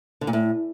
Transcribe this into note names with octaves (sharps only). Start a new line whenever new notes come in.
D3
A#2
A2